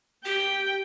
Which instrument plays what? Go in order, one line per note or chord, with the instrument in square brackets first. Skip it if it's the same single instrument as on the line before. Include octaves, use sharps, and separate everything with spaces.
[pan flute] G4 [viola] G5